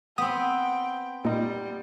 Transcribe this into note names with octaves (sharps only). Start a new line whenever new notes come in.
B3 C4 G5 D#6
A#2 G3 D#4